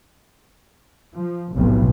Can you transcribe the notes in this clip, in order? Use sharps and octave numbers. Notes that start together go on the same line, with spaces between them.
F3
F1 B1 A2